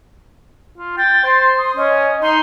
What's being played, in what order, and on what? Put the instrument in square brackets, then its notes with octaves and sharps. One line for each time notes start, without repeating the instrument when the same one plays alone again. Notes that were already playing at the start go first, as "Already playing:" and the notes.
[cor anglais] F4
[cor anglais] G5 [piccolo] A6
[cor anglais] C5 [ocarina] C6
[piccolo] D#6
[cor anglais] C#4 [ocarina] D#5
[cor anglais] D#4 [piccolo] C6